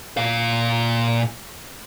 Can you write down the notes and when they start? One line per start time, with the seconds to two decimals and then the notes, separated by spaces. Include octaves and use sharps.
0.17 A#2 F5